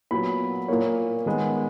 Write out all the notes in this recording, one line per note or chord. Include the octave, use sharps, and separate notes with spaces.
A#2 F#3 B3 B5
A#2 A#3 C#5
D#3 G#3 B3